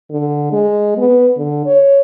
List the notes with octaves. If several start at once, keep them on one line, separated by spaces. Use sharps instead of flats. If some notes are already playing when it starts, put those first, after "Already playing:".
D3
G#3
B3
D3
C#5